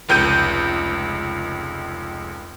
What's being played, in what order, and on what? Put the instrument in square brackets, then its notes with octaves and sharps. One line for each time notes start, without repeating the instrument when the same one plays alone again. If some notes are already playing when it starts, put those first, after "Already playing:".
[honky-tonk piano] F1 C#2 G6 D#7